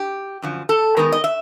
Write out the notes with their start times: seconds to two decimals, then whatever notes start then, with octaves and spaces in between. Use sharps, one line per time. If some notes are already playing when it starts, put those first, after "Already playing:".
Already playing: G4
0.42 F#2 D3 F3
0.69 A4
0.97 D#3 G#3 B3 D#4 A#4
1.12 D#5
1.24 E5